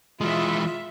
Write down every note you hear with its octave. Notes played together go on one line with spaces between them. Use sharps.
E3 G#3 F4 E5